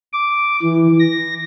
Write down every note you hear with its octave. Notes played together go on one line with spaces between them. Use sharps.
D6
E3
A#6